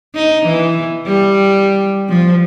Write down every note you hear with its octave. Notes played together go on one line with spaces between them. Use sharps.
D#4
E3
G3
F3